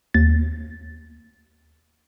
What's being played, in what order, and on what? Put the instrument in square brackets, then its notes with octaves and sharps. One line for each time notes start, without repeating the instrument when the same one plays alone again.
[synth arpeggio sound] D#2 A6